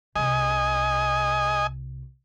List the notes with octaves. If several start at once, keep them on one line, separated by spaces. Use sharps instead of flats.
C2 C3 D#5 G#5